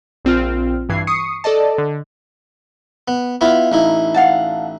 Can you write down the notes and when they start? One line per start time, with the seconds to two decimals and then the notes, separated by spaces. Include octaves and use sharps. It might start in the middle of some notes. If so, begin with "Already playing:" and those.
0.25 A#1 C4 F4 F6
0.89 G2 E3 G#6 C7
1.07 C#6 D#6 C7 C#7
1.44 A4 D5 D#5 A5
1.78 D3
3.08 B3
3.41 B3 E4 F4 F5 B5
3.72 A1 D#4 E4
4.14 F5 F#5 A5